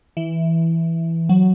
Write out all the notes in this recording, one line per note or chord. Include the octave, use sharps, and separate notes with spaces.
E3
F#3